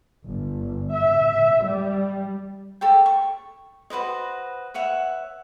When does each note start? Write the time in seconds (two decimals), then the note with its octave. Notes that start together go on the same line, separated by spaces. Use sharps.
0.24 G1
0.93 E5
1.64 G3
2.81 G4 A4 C#5 G5
3.06 C#6
3.90 F#4 B4 C5 D#5
4.74 B4 C#5 E5 F#5